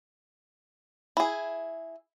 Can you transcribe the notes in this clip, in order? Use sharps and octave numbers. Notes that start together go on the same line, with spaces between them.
E4 G#4